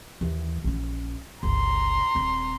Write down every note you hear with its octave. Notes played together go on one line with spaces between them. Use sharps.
D#2 E3
A#1 C#4
G1 C#2 A#5 C6
D#1 C4